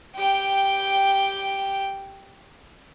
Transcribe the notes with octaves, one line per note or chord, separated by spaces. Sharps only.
G4 G5